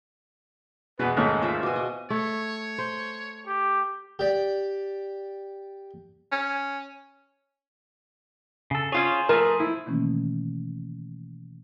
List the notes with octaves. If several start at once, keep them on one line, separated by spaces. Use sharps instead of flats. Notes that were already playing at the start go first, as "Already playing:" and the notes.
E2 B2 G#3 G#4 B4
D#2 G#2 G#3 A3 C#4 C#6
F4 C5 E5
B2 F#4 G#5 D6
D#5
A3 C#5
C5
G4
G4 D5
C#4
C#3 A4
C#4 F4 G#4 C5 C#5
F3 A3 A#4
E4
B2 D#3 E3 A3 A#3 C#4